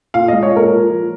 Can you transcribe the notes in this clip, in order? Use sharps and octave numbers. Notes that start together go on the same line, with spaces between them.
A#2 F5
G#3 D#5
C#5
A#2 A#4
A#2
F3